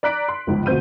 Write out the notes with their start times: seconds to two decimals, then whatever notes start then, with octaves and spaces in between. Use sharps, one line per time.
0.03 D5 A#5 F#6 B6 D7
0.28 C6
0.47 G1 C#2 G#2 F3
0.66 D2 B2 C4 G6 D#7